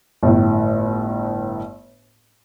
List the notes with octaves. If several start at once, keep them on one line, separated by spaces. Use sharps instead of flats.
G1 A2